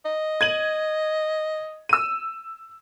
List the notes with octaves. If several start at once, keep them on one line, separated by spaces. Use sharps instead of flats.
D#5
G#6 D#7 F#7
E6 D#7